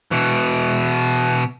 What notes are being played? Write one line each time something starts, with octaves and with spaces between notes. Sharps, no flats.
B2 E3